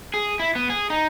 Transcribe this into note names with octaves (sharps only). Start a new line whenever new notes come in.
G#4
E4
B3
G#4
D#4